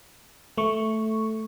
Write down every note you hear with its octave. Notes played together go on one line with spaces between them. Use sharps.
A3 C#6